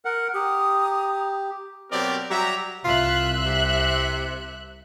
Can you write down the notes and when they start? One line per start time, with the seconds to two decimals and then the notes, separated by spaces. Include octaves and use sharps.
0.05 A#4 F#5
0.34 G4 A#5 D#6
1.91 B2 F#3 C4 G4 A#4 D5
2.30 F#3 G3 G4 E5 A#5
2.85 C2 F4 E5 F#6
3.45 C3